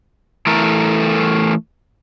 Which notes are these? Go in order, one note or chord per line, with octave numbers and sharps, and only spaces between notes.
E3 A3 A4 A#4